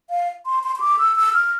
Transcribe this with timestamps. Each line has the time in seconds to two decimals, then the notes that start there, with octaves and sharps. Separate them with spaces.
0.10 F5
0.46 C6
0.63 C6
0.76 C6
0.80 D6
0.99 E6
1.16 E6
1.34 F6